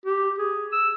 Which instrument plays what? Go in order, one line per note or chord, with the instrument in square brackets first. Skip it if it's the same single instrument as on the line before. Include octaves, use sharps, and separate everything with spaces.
[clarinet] G4
G#4
E6